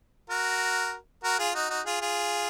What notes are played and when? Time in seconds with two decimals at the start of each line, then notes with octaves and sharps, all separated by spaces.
0.30 F#4 A#4
1.24 F#4 A#4
1.39 F4 G#4
1.54 D#4 F#4
1.70 D#4 F#4
1.86 F4 G#4
2.01 F4 G#4